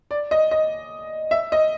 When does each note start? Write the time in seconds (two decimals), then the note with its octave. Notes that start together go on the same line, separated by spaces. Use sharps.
0.11 D5
0.31 D#5
0.51 D#5
1.31 E5
1.52 D#5